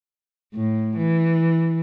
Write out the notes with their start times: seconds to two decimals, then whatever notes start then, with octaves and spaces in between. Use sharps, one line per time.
0.54 A2
0.96 E3